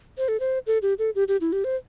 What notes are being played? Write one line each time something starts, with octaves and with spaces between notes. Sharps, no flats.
C5
A4
C5
A4
G4
A4
G4
G4
E4
G4
C5